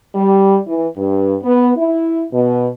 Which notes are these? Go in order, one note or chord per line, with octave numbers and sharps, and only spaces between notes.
G3
E3
G2
B3
E4
B2